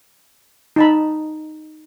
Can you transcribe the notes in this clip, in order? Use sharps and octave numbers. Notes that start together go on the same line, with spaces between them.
D#4 A5 B5